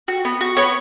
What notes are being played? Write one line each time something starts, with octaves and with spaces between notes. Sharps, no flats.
F#4
B3
F#4
B3 C#5